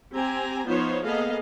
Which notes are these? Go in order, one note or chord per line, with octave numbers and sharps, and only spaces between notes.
C4 G4 G#5 A#5
F3 B3 D#4 F4 C5 C#5
A#3 B3 G#4 A4 D#5 F5